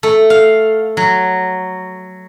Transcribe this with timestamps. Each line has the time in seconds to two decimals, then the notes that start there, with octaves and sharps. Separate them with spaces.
0.03 A3
0.30 F5
0.97 F#3